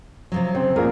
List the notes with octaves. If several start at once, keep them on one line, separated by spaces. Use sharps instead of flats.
C3 F3 F#3
C#3 C4
A#1 A2 G#4 A#4